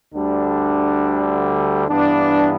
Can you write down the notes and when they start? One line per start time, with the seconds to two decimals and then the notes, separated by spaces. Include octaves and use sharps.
0.13 D2 D3 G3 D4
1.89 G2 E3 B3 D4